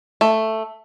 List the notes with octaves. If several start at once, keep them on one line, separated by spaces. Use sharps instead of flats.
A3